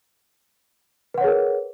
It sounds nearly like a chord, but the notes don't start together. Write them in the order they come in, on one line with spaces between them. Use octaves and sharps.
B4 F#5 C#5 G#4 A#4